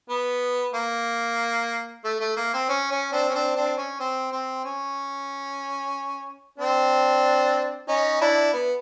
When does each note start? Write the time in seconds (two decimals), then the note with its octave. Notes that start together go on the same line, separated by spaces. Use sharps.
0.10 B3
0.74 A#3
2.05 A3
2.20 A3
2.37 A#3
2.54 C4
2.69 C#4
2.91 C#4
3.12 C4 D4
3.29 C#4
3.34 C4 D4
3.56 C4 D4
3.78 C#4
4.00 C4
4.32 C4
4.64 C#4
6.58 C4 D4
7.88 C#4 D#4
8.21 D4 E4
8.53 B3